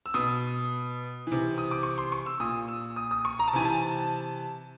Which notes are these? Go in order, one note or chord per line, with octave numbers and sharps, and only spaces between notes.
E6
B2 D#6
C3 E3
D#6
D6
C#6
C6
C#6
E6
A#2 D#6
E6
D#6
D#6
C#6
A#5
A5
C3 E3 G#5
A5